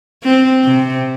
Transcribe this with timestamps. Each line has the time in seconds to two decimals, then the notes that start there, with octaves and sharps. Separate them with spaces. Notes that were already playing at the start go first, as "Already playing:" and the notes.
0.24 C4
0.65 C3